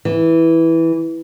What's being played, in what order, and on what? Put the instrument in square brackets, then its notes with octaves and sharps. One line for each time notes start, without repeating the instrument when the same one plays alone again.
[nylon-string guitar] E3